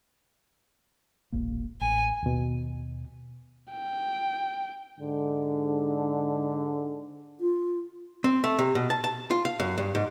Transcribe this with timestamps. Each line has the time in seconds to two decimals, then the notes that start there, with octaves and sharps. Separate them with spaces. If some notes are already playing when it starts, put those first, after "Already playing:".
1.32 E1 A#1 A#3
1.81 A1 G#5
2.23 D#2 B2
3.71 G5
4.99 G#2 D3
7.40 F4
8.24 C4
8.44 A3
8.59 C3
8.75 B2
8.90 A5
9.04 A5
9.31 F4
9.45 F5
9.60 F#2
9.78 G2
9.95 G#2